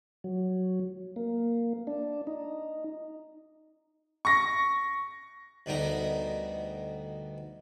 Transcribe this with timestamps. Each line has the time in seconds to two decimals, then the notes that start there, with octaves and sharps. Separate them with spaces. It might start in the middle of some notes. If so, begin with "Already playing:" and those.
0.24 F#3
1.16 A#3
1.87 D4
2.27 D#4
4.25 C#6 A#6
5.66 D2 B2 G3 D#4 A#4 A#5